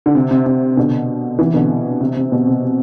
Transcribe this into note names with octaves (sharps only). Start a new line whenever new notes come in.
D3
C3
C3
C3
B2 D3
C3 E3
B2 D3
C3
C3
B2
C3